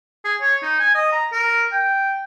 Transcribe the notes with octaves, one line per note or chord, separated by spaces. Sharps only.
G#4
C#5
D#4
G#5
D#5
A#5
A#4
G5